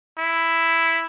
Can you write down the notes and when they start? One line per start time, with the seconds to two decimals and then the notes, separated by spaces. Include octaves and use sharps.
0.18 E4